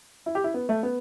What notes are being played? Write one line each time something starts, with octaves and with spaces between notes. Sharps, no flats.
E4
G4
E4
B3
A3
B3